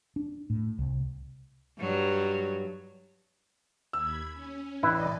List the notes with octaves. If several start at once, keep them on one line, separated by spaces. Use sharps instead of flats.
D4
A2
C2
G2 F#3
D#2 B5 E6 G#6
C#4
A1 E4 B4 D5 D#5